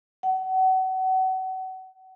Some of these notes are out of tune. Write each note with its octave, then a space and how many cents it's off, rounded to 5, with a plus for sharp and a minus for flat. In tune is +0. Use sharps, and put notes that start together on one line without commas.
F#5 +30